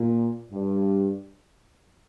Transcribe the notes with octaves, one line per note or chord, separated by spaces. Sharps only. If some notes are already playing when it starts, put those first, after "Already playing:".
Already playing: A#2
G2